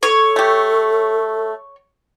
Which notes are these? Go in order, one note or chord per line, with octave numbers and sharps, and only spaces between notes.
A4 C#5
A3 G4